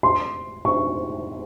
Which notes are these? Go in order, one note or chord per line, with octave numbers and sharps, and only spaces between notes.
C6
C#6